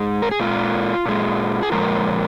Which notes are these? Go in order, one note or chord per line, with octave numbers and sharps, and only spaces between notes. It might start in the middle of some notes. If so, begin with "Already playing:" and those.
Already playing: G#2 G#3
A#4
G#4
A#2 G#3 F4
A#2 G#3
G#4
A#2 F3 G#3 A#4